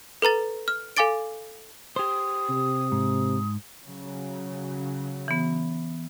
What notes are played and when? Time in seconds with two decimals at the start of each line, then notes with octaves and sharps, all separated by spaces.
0.22 A4 B4 A#5 A6
0.68 F6
0.97 A4 F5 G#5 D6 A6 D7
1.96 G4 C5 D#6
2.49 C3
2.92 G#2
3.83 C#3 F#3
5.28 E3 B3